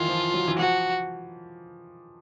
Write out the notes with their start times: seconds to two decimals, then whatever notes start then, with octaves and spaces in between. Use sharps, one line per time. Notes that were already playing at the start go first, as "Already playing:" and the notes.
Already playing: D#3 E3 F4
0.08 F3
0.34 F#3
0.48 E3
0.58 F3 F#4